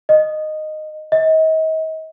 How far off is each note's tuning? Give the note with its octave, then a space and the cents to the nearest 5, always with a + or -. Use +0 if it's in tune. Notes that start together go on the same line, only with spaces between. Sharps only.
D#5 -10
D#5 +35